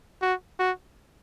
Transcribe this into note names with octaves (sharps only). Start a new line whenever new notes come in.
F#4
F#4